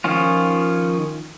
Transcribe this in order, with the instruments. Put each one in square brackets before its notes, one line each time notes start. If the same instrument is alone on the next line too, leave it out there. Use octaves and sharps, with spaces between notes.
[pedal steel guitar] D#3 F3 C#4 F4